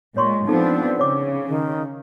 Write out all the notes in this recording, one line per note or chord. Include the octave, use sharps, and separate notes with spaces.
A#2 G#3 C#5 C6 C#6
F3 B3 C4 D4 D#4 A4 A5
C#3 C#5 D6
D#3